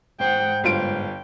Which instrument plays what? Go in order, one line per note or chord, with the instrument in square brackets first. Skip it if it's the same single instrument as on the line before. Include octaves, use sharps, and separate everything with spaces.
[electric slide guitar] G#2 C5 [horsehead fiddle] F#5 G5
[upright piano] G1 F4 D7 [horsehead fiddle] G5